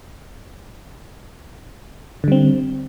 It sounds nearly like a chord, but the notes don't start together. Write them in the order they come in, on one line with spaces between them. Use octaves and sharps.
D3 G3 C4